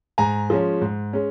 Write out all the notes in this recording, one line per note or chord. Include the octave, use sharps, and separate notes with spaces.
G#2 G#5 A#5
F3 G#3 C#4
G#2
G#3 C#4